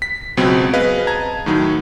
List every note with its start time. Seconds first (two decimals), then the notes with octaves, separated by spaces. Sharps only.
0.02 B6
0.37 C#2 B2 F#3 B3 C4
0.74 G#4 B4 D#5 F5
1.07 A5 A#5 G#6
1.46 A2 D#3 F#3 D#4